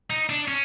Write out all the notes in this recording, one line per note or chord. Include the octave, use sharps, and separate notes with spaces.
D#4
D4
C#4